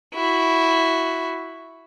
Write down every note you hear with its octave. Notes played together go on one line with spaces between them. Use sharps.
E4 F#4